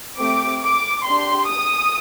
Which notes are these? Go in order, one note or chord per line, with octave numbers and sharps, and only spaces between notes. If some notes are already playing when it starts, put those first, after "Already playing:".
A3 C4 G4 D6
D6
D4 G4 C6
D#6